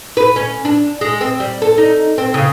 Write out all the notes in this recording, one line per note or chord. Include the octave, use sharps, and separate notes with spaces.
B4
C#4
D4
G#3
C4
G3
A4
D#4
C4
C#3